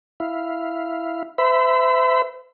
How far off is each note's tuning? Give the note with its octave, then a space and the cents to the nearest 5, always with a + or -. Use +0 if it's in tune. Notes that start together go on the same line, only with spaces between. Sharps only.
E4 +0 F5 -5
C5 -40 E5 +5 B5 +0